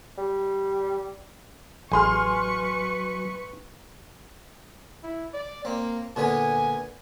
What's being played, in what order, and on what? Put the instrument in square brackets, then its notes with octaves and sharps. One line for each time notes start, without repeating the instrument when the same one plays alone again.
[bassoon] G3
[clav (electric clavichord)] A1 G#4 [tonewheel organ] F#3 [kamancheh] B4 C#6 [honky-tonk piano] G#5 C6 F6
[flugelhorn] E4
D5
[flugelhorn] A#3 [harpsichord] C4
[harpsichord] A#2 D3 B3 [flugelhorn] G#5